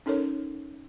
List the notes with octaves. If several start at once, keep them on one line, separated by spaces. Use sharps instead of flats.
C#4 D#4 A4 A#4 C#5